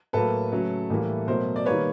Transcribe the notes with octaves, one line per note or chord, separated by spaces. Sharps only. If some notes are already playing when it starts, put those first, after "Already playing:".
A2 F#3 A#3 A4 B4
C#3 F#3 A3
A2 E3 G3 A#3
B2 F#3 A3 A#4 C5
D5
D#3 G3 A#3 B4 C#5